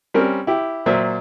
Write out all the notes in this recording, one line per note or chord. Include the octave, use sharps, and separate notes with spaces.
G3 C4 C#4 A#4
E4 G4
A#2 F#3 C5 E5